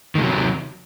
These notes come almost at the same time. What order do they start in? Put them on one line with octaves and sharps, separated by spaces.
D#3 G#3 C3 F#3